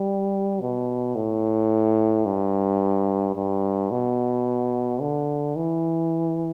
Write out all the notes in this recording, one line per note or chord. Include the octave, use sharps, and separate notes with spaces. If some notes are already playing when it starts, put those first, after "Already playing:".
Already playing: G3
B2
A2
G2
G2
B2
D3
E3